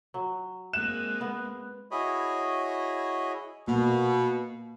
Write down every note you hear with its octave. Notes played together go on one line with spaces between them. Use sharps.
F#3
G#3 A#3 C4 F#6 E7
B3
E4 F#4 G#4 C#5 D#5 B5
B2 A#3